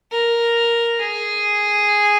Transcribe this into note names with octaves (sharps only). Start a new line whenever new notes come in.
A#4
G#4